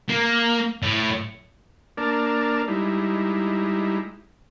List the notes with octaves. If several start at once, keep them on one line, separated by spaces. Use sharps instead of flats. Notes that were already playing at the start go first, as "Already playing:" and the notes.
A#3
A2
A#3 D4 A#4 D5 A5
G3 G#3 D#4 E4